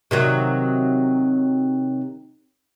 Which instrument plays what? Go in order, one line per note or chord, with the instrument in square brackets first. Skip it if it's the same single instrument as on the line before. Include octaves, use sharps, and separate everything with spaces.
[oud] C3 D#3 F#3